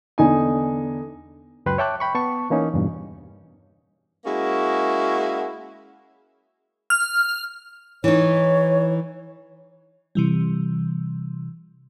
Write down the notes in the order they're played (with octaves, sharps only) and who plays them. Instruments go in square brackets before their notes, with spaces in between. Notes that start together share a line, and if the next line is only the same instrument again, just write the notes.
[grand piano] E2 D3 D#4 G#5
[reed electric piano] C#2 F#2 B4 G5 C6 F#6
C#5 E5 G5 A5 D6 F#6
G5 B5 C#6
B3 A5 C#6
E3 A#3 C#4 D#4
E2 G2 B2
[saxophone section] G#3 A#3 C#4 E4 F#4
[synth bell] F6
[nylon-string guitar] E3 D#4 [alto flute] C#5
[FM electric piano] C3 E3 G3